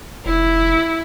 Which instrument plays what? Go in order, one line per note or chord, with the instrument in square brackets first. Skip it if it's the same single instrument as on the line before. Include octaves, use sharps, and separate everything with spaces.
[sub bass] F1 [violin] E4